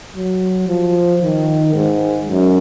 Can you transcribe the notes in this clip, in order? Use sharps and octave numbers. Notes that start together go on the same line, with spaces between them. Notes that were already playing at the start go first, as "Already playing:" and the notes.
F#3
F3
D#3
G#2
F#2